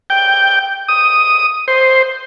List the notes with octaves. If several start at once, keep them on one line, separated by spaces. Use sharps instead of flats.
G5
D#6
C5